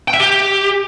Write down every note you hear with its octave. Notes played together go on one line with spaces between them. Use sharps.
G5
E5
G4